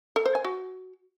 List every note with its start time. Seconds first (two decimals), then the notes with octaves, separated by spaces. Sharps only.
0.16 A4
0.26 C5
0.35 G#5
0.44 F#4